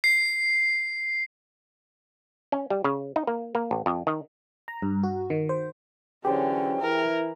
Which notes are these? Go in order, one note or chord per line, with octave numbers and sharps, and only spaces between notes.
C7
C#4
G3
C#3
D#4
A#3
A#3
A1
F2
D#3
A#5
G2
F#4
D#3
C5
D3 E3 F#3 C#4 G4 G#4 C5 G5
E3 E4 A#4